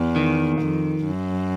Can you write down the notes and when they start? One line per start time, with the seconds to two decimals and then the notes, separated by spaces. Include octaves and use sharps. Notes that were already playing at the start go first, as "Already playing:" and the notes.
Already playing: E2
0.16 D#3
0.61 F2
1.06 F#2